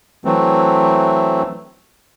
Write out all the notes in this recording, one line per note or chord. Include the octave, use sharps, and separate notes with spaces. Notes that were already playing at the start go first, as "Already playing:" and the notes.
E3 F#3 A3 C4